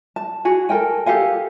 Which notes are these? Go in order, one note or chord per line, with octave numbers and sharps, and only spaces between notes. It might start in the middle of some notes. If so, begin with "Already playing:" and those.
A5
F#4 G#4 G#5
A4 A#4 G5 G#5
G4 A4 F5 G#5